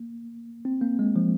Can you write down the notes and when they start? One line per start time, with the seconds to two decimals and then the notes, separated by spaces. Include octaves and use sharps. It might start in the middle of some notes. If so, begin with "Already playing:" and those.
Already playing: A#3
0.65 C4
0.81 A#3
0.99 G#3
1.16 F3